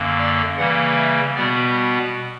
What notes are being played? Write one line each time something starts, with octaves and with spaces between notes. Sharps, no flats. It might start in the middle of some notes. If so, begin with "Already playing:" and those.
Already playing: F#2 D3 A#3
D5
C#3 E3 G3 A#3 F#5
E5
B2 G3 B3 D5